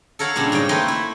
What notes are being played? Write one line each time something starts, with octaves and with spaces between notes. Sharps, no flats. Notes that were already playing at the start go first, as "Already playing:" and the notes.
A4 A#4 C#5 F5 F#5
A#2 C#3 G3 D4
G#2 C#3 C#5 G5
A3 A#3 C4 D#4 B4 C5
E4